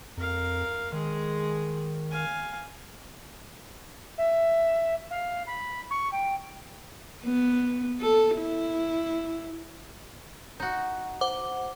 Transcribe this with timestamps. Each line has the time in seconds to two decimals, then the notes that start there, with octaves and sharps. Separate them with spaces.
0.17 F2 A#4 F5
0.93 D#3 G#3 G#4
2.11 F5 G#5
4.18 E5
5.11 F5
5.47 B5
5.91 C#6
6.12 G5
7.24 B3
8.01 A4
8.37 E4
10.60 D#4 F#4
11.21 C5 F#5 D6